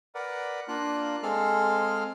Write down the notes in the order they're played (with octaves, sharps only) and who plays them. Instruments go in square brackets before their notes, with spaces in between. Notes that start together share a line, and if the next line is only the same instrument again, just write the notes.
[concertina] A#4 B4 D5 F#5
A#3 D4 F4 F#6
G#3 C4 G#4 A4 F5 F6